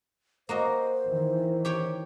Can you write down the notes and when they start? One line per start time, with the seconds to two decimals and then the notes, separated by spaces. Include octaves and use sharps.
0.49 A#3 F#4 C5 D#5
1.07 D#3 E3
1.65 G4 C#5 G5